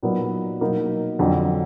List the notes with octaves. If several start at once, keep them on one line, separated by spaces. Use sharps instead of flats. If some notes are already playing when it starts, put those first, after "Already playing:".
A#2 F#3 B3 D#4 A#4
B2 F#3 A#3 D#4 A#4
F2 D3 F#3